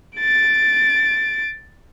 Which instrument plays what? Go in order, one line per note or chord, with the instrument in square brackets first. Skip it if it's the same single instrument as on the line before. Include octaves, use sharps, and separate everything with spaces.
[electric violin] A6 D7